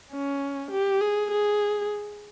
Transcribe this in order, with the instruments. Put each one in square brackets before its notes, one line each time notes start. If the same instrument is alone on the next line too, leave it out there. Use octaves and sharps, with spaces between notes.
[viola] C#4
G4
G#4
G#4